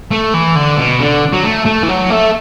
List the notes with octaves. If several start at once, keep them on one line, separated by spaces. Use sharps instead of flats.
A3
E3
D3
B2
D3
F#3
A3
A3
E3
F#3
A3